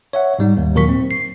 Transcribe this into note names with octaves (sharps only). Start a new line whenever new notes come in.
C#5 E5 F#5
G#2 G3 D#4
D#2
D#2 A#2 F#3 A#4 C#6 B6
C4
C7